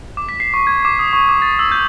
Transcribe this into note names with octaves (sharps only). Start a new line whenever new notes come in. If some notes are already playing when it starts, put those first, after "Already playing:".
D6
B6
C7
C#6
G#6
D6
D#6
C#6
D6
A6
E6
G6